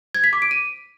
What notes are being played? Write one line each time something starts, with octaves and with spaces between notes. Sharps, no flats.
G#6
B6
D6
D7
D#7